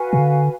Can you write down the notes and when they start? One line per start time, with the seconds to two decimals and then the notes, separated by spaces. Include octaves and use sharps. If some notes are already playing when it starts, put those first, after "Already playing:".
Already playing: F#4 B4 F5 G#5
0.13 B2
0.18 D3